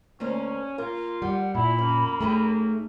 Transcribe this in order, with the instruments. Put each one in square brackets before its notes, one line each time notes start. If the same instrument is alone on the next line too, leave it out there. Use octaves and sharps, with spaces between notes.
[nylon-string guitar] D2 A#3 C5 [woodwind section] C#4
[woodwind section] A#3 F4 [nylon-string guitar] A#4
[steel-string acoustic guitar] G3 [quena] F#5
[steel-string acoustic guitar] A#2 [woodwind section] E4 [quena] B5
[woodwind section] F#2 A#3 [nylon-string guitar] C#4
[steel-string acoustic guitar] A3 [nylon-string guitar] D#4 G#4 G5